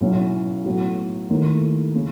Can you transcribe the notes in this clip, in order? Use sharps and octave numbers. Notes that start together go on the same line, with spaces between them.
B1 B2 F#3 C#4 E4
A2 F#3 B3 F#4
D#2 D#3 A3 E4
C#3